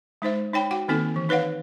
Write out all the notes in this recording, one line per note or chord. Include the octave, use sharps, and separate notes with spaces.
G#3 D#4 C5 E5
D#4 C#5 G5 B5
F#4 F#5 G5
D#3 A#3 C4 D#4 A4 G#5
E3
D#4 B4 C#5 F5 F#5